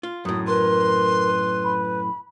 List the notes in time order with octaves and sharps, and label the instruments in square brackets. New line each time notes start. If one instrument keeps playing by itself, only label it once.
[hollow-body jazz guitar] F4
[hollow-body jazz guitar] F#2 A2 [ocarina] D#6
[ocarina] A#4 [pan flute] B4 [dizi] C6
[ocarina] B5